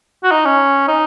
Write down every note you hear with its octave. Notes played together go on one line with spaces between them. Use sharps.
F#4
D#4
C#4
D#4